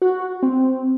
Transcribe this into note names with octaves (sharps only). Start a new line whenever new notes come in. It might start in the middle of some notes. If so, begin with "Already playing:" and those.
F#4
C4